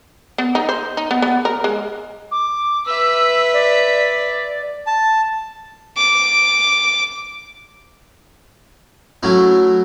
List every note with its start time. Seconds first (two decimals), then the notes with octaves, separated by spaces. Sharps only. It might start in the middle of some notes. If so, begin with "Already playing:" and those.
0.38 B3
0.55 D#4
0.69 C5
0.97 D#4
1.11 B3
1.22 B3
1.45 A#4
1.64 G#3
2.31 D6
2.86 B4 E5 E6
3.53 D5
4.87 A5
5.97 D6
9.23 F#3 A3 C#4 E4